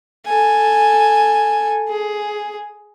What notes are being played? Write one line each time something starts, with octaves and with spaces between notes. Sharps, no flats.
A4 G#5
G#4